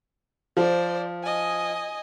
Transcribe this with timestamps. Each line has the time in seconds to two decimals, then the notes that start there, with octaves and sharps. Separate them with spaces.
0.57 F3 C5 D5
1.23 D#5 G#5